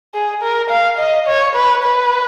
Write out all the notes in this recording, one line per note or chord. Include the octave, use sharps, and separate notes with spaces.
G#4
A#4
F5
D#5
C#5
B4
B4